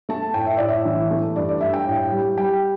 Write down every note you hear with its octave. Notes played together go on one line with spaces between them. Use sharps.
A3 A5
A2 G5
E5
A2 D5
E5
E3
A3
G2 D5
D5
G2 E5
G5
A2
G3
G3 G5